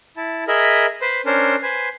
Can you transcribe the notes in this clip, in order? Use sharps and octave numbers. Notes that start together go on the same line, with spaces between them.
E4 A5
G#4 A#4 D#5 E5 B5
B4 C5
C#4 D4 A#4 C5
B4 C5 G#5